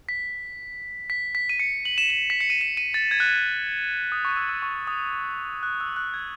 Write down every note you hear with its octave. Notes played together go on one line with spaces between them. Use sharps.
B6
B6
B6
D#7
C#7
F#7
E7
E7
B6
C#7
D#7
E7
D#7
A6
G#6
F#6
G#6
D#6
C#6
E6
E6
C#6
D#6
F#6
E6
F#6
G#6